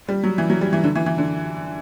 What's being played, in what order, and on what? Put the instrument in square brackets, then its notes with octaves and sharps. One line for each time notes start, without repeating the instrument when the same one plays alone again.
[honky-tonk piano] G3
F#3
E3
F#3
G3
E3
D3
E3
E3
D3